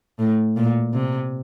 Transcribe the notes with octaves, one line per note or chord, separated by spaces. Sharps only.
A2
A#2
C3